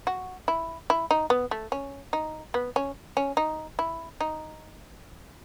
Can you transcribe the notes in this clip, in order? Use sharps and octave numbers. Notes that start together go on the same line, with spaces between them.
F#4
E4
E4
D#4
B3
A3
C#4
D#4
B3
C#4
C#4
D#4
E4
D#4